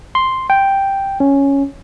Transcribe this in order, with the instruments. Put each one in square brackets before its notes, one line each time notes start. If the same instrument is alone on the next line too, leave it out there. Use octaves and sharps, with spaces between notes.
[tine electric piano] C6
G5
C#4